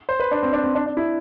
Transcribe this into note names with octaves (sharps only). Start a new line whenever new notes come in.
C5
B4
D4
C4
D4
C4
D4
D4
E4